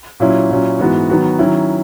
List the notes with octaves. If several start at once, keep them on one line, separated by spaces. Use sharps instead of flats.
A#2 F#3 C#4 E4
A#2 F#3 C#4 E4
G#2 E3 B3 F#4
D#3 F#3 B3 F#4
D#3 F#3 C#4 E4